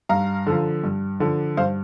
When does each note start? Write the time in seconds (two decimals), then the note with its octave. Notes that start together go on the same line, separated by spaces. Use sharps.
0.09 G2 F5 A#5
0.47 D3 F3
0.84 G2
1.20 D3 F3
1.57 G2 C5 F5